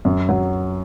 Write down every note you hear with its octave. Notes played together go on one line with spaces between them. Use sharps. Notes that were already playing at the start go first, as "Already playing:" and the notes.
F#2
F#3